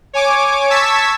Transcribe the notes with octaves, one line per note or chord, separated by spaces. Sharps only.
C#5 G#5 D6
A5 C#6 E6 G#6 B6